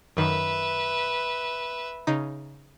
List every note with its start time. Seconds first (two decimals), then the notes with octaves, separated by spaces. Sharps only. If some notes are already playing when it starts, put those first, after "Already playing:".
0.17 F#2 D#3 B4 E5
2.07 C#3 D#4